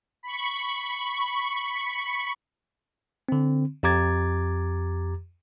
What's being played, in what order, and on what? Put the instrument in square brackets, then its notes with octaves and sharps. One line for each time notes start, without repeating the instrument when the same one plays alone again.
[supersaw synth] B5 C#6
[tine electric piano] D3 C4
F2 G4 A#5 D6 G#6 A6